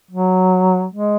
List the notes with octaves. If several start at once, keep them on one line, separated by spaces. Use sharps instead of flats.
F#3
G#3